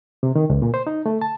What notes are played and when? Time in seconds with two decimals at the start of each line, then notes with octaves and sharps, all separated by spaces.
0.23 C3
0.36 D#3
0.50 C#2
0.62 A#2
0.74 C5
0.87 D#4
1.06 A3
1.22 A5